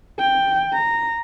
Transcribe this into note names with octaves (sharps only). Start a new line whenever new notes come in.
G5
A#5